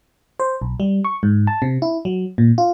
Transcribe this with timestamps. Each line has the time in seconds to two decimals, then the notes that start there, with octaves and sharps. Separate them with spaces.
0.40 C5
0.62 B1
0.80 G3
1.05 C#6
1.23 G#2
1.47 A5
1.62 C3
1.82 E4
2.05 F#3
2.38 A#2
2.58 F4